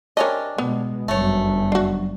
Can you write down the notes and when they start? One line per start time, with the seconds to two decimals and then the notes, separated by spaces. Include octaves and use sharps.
0.17 C3 C#4 D4 A#4 D#5
0.58 B2 G#3 B3
1.08 G1 F#2 F#3 A3 C#5
1.72 D4 F#4